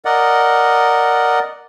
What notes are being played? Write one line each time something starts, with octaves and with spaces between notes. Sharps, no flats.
A#4 D5 D#5 F#5